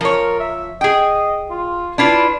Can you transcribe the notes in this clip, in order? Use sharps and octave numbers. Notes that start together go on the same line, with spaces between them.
F3 A#4 C#5
E5
G#4 D#5 G5
F4
D4 E4 F4 B4